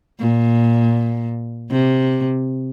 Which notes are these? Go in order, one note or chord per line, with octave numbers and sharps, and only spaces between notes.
A#2
C3